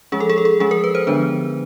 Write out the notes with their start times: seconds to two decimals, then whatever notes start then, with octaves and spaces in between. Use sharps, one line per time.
0.12 F3 G#3 C#4 G#4
0.20 A4
0.30 G#4
0.38 A4
0.45 G#4
0.60 F3 G#3 C#4 G#4
0.71 A#4
0.84 B4
0.95 C5
1.07 D3 F3 G#3 B3 D4 B4